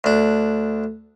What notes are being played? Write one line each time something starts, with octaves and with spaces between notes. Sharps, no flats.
D2 D4